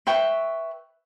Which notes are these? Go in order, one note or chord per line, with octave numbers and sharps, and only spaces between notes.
B4 E5 G5 C#6